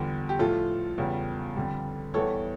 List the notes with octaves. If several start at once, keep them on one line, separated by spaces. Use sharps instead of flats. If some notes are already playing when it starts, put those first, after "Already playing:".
Already playing: E2 D3 G3 F4
G4
A2 F3 F4 A4
E2 C#3 G3
F2 D3 G3
E2 E3 G3 A4 C#5